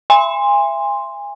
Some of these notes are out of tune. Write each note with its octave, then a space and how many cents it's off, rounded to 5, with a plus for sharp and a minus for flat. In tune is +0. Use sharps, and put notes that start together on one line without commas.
E5 +30 G#5 -30 C6 +0